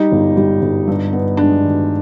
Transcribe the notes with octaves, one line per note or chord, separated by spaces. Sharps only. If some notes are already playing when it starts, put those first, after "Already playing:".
Already playing: G3 D#4
G1
G3
G1
G2
B3
G#3 D4
D#3